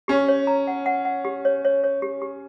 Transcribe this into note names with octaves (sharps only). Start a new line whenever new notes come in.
C#4 G4
C#5
A#5
F#5
F#5
F#5
G4
C#5
C#5
C#5
G4
G4